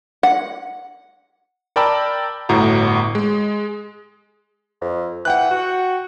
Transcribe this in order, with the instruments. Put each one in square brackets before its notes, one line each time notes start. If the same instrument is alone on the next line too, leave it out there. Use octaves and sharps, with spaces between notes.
[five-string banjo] F#5
[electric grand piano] A#4 D5 G5 A5 B5 E6
G1 A2 F#4 A#5
G#3
[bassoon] F2
[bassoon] E3 [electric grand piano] F#5 G5 F#6
[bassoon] F#4